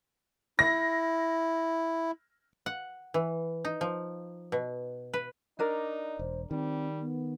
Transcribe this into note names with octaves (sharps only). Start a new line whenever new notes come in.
E4 A#6
F#5
E3
D#4
F3
B2
B4
D4 D#4 A#4 D5
E1 C5
D#3 G3 C4
B3